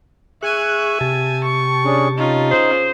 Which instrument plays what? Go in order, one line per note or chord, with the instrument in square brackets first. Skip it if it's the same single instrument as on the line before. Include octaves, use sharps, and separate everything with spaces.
[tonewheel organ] G#4 C#6 F#6 [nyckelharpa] E5 G#5
[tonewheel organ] C3 G4 A5
[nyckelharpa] C#6
[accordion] C#4 D4 G#4
[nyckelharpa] C#4 F4 [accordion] D#4
[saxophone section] G#4 C5